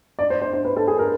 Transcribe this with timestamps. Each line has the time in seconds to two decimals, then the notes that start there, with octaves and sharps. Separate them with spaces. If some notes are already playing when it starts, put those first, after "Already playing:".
0.19 D5
0.30 C5
0.42 C5
0.53 C5
0.65 B4
0.76 A4
0.88 G#4
0.99 A#4